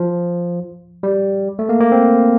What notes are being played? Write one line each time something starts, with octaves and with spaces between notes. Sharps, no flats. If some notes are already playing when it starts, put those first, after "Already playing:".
Already playing: F3
G3
A3
A#3
A#3
C4